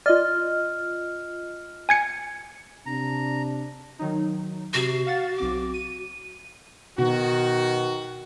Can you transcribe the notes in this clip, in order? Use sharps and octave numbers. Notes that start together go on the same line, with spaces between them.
F4 D5 D#5 F6
G#5 G#6 C#7
C3 D4 A#5
D#3 F#3 D#4
C3 F#4 C7
F5 F#5 A6
B1 C4 D6
D#7
B2 D#3 F#4